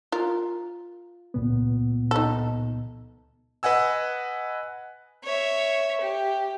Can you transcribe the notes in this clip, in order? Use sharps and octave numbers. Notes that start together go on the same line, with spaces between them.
F4 A#4
C#2 A#2 B3
D#4 A4
B4 D#5 F#5 G#5 E6
C#5 E5
G4